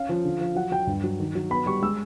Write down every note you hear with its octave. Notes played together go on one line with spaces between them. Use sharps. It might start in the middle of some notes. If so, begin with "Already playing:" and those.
Already playing: C#4 F5
F3
D3
F3
F#3 F#5
F#3 G5
G2
F#3
D#3
F#3
B3 B5
G3 C#6
G#3 E6